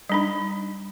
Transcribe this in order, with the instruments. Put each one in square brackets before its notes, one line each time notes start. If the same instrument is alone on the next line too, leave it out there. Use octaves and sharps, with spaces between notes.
[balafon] G3 D4 D#4